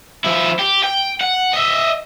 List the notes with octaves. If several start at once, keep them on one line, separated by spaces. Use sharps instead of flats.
F3 E4
G4
G5
F#5
D#5 E5